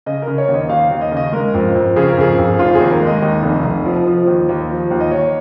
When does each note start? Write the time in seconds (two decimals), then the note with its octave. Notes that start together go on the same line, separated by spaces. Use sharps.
0.06 C#3 D#5
0.22 A#4
0.27 C#3
0.38 C#5
0.48 D#2
0.54 D#5
0.69 D#2 F5
0.91 D#2
1.01 D#5
1.11 C#3
1.17 D#5
1.32 G#3 A#4
1.54 F2
1.75 F2
1.96 C#3 G#4
2.08 A#4
2.17 F2 G#4
2.38 F2
2.59 F1 F4
2.75 G#4
2.80 D#2
2.91 A#4
3.01 G#3
3.07 D#5
3.22 D#2 D#5
3.43 F1
3.64 F1
3.85 F3
4.07 F3
4.27 D#2
4.49 D#2
4.70 F3
4.91 D#2
5.00 D#5
5.11 D#2 C#5